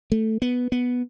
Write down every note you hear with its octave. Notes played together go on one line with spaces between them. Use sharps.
A3
B3
B3